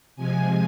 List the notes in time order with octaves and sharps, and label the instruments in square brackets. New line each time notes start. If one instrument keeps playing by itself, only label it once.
[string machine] C3 F3 G#3 G#5